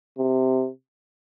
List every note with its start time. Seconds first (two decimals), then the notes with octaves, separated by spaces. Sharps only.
0.18 C3